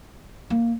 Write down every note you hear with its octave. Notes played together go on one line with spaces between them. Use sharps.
A#3